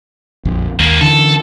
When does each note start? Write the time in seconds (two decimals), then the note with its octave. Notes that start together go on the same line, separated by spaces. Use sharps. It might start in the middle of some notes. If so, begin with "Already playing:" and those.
0.45 A#1 F2
0.80 D#2 G#2 A#3
1.01 D3 E3 A4